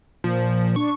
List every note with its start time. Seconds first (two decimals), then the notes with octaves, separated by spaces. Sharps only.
0.24 A#2 F3
0.76 D4 C#6